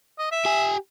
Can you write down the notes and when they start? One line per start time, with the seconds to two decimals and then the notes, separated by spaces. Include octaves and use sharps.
0.19 D#5
0.32 E5
0.45 G4 G#5